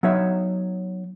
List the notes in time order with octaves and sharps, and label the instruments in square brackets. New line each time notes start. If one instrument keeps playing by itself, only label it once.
[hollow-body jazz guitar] F#3 B3 D#4 C#5 E5